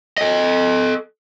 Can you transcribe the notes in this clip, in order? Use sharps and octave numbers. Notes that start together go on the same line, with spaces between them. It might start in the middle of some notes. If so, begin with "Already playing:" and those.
A4 D#5